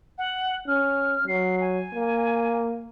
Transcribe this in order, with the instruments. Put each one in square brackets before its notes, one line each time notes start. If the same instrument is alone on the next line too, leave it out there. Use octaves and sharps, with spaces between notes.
[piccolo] F#5
[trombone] C#4 [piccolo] F6
[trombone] F#3 [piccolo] C7
[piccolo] G#5
[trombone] A#3